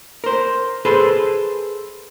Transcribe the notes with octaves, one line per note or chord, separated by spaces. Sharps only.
A#4 C5
G#4 A4 B4 C5